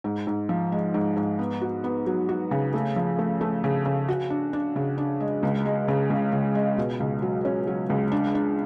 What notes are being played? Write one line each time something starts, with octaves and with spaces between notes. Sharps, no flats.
G#2
G#2
F3
G#3
G#2
G#2
B3
F#4
B3
F#3
F#4
C#3
A3
F3
A3
A3
C#3
C#3
F#4
D4
D4
C#3
D4
G#3
C#2
G#3
C#3
C#2
C#2
G#3
B2
C#2
F#3
C#4
F#3
C#2
D4
D4